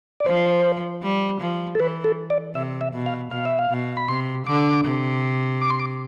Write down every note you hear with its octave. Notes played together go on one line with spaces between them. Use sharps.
D5
F3 C5
G3
F3
A4
E3 B4
A4
D5
C3 E5
E5
B2
F5
B2 F5
E5
F5
B2
B5
C3 C6
D3 D6
C3
D6
C6
D6